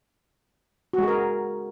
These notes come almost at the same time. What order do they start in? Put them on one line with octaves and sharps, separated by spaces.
F#4 G#3 G#4 A#4